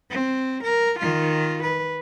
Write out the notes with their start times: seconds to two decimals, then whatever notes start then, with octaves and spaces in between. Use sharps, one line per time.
0.10 C4
0.63 A#4
0.99 D#3 F4
1.63 B4